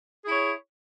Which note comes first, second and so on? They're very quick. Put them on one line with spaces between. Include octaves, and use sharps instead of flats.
G#4 E4 C#5